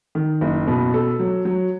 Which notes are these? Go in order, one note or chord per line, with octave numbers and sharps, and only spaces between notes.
D#3
F#1
B2
A4
F#3
F#3